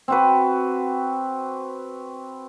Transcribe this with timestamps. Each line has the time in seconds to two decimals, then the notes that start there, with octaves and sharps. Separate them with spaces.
0.08 C4 F#4 B4